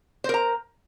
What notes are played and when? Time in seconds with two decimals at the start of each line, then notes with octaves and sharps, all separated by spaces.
0.24 C5
0.29 A#4
0.34 A#5